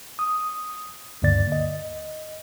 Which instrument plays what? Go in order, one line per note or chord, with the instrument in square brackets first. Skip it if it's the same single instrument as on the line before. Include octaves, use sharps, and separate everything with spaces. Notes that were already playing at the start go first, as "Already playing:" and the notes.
[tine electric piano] D#6
D2 G2 D3 A#3 D5 A6
D#5